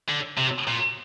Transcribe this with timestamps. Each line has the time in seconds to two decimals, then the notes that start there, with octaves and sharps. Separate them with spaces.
0.09 D3
0.37 C3
0.67 A#2